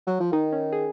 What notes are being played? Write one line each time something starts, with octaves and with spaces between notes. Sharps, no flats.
F#3
F3
D#3 D#4
C#4
G#4